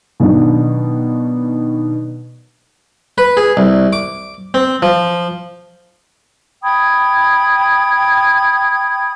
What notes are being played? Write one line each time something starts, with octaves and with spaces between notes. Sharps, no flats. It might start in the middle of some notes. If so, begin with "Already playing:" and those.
B2 D#3 F#3 D4
B4
G#4
C2
D6
C4
F3
G5 B5 D#6 G#6